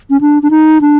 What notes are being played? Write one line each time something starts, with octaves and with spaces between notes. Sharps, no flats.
C#4
D4
D4
D#4
D4